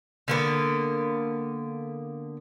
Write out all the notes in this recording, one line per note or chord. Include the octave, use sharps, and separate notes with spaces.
D3 A#3 B3